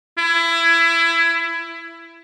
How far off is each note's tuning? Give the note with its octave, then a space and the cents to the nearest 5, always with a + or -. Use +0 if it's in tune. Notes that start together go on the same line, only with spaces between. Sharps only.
E4 +20